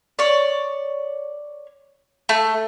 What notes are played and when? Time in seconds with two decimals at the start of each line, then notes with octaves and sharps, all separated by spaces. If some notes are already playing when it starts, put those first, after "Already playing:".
0.19 C#5 D5
2.29 A3